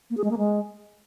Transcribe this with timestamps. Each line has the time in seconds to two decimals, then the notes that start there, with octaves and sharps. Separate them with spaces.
0.10 A#3
0.17 G#4
0.24 G#3
0.31 A#3
0.38 G#3